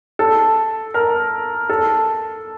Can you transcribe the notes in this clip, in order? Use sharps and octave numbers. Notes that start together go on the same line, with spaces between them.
A4
A#4
A4